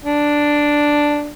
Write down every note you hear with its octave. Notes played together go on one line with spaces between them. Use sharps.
D4